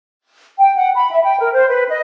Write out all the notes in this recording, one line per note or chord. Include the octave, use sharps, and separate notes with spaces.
G5
F#5
B5
E5
G5
A#4
C5
B4
D#5